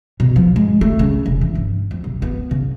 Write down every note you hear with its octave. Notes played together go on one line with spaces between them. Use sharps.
B2
F3
G#3
A3
C#3
E1
E3
G1
F2
B1
B3
C#3